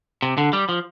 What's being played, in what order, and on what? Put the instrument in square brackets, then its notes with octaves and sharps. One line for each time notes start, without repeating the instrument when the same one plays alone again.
[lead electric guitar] C3
D3
G3
F3